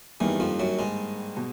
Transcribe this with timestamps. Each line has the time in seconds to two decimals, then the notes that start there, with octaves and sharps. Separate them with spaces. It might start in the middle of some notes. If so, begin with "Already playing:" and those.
0.20 E2 G2 D#3 E3 G3 A#3 D#4
0.40 F2 F3
0.59 F#2 F#3
0.79 G#2 G#3
1.37 B2